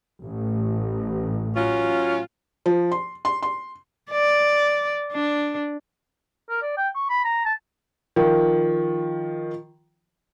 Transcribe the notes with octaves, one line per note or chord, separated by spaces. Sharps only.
A1
F#3 C#4 F4
F3
C6
C6
C6
D5
D4
A#4
D5
G5
C#6
B5
A#5
A5
D#3 F3